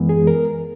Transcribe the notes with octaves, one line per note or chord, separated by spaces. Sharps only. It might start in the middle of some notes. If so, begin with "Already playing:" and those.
Already playing: F#2 E3 G#3 B3
G#4
A#4